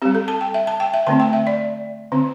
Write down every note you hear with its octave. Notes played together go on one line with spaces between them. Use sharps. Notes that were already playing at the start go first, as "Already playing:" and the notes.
G3 C4 G4
A4
A5
G5
E5
A5
G5
E5
D3 A3 C4 A5
G5
E5
D5
D3 C4